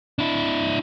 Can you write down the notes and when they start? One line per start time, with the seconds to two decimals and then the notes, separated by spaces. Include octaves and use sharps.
0.19 D4 E4